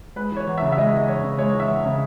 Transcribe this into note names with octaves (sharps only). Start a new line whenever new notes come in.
G#3 B4
E3 C#5
E2
C#3 E5
E5
G#3 D#5
E3
E2 C#5
C#3
G#3 C#5
E3
E5
E2
C#3